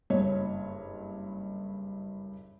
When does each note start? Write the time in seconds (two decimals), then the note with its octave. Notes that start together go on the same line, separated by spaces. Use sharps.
0.10 F#1 G2 C#5